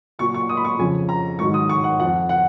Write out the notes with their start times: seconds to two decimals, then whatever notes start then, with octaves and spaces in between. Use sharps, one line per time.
0.19 A#2 F#3 C#6
0.34 C#6
0.49 D#6
0.57 B5
0.65 C#6
0.79 F2 C#3 F3 G#5
1.09 A#5
1.39 G#2 D#3 F#3 C#6
1.54 D#6
1.69 C#6
1.84 F#5
2.00 F2 F3 F#5
2.29 F#5